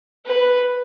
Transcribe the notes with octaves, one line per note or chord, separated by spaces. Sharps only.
B4